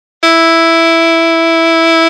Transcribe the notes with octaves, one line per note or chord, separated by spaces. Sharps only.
E4